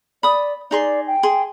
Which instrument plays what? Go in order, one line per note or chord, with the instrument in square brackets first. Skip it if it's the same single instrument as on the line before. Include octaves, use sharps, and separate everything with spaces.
[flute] D5 [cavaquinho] B5 D#6
[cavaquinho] D#4 G#4 C6 [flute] D5
[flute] G5
[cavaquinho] G#4 C6